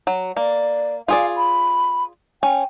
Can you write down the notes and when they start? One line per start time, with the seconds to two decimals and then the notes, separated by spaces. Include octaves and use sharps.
0.07 F#3
0.36 A#3 D5
1.08 F4 G#4 D5 F5
1.37 B5
2.43 C#4 G5